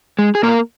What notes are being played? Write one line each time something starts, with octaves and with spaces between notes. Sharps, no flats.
G#3
G#4
A#2 A#3 A#4